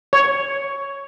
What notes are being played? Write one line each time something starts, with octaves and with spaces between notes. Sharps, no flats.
C#5